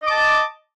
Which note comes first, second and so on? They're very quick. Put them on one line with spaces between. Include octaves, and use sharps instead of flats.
D#5 D6 A5